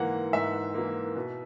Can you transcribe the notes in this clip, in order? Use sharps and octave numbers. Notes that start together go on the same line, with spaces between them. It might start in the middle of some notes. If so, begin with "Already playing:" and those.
Already playing: G#2 E3 A#3 F#5
G#2 E5
E3 A#3
B2